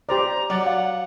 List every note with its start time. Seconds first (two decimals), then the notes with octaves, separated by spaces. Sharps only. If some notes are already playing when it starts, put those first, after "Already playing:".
0.09 G4 C5 D5 A#5
0.50 F#3 D5 F#5
0.66 F5